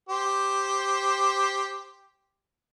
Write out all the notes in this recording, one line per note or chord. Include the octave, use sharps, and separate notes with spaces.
G4 C5